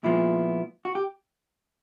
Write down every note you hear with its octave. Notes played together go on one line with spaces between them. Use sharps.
A#2 F3 G#3 B3 E4
F#4
G4